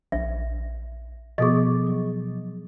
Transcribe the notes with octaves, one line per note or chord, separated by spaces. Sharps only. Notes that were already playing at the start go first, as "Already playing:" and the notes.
A#1 E5
B2 F3 B3 G#4 A4 D#5 C#6
F#3